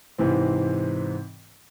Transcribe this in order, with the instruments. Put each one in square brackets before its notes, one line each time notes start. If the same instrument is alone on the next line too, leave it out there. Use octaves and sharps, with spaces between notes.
[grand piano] G#2 C3 E3 C4